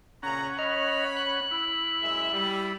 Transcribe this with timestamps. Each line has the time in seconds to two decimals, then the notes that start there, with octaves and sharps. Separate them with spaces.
0.23 A#2 C#3 C#4 F#5 A#5
0.59 C#5 D#5 B5 F6
1.17 F#6
1.51 E4 B5
2.01 F#2 G#3 E5
2.32 G3